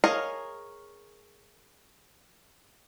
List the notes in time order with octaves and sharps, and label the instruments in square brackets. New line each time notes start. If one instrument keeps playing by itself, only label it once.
[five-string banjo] G#4 A#4 C#5 D#5 F5